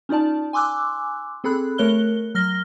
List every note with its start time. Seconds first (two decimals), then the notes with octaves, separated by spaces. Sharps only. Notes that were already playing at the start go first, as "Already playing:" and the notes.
0.09 C#4 D#4 F4 D5 A5
0.53 G#5 C6 D6 E6 F#6
1.44 C4 G#4 A4 B5 F#6
1.78 A3 A#4 C#5 F#6 G7
2.35 F#3 F6 A#6 G7